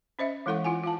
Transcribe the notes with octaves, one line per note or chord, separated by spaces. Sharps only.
C#4 C5 D#5 E5
E3 G#3 E4 A4 F#5 C#6
E4 F4 F#5 G#5
F4 F5 A5